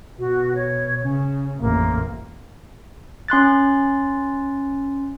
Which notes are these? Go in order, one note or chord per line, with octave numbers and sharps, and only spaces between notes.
B2 F#4
C#5
C#3 C#4
A1 F2 A#3
C#4 C6 F#6 A6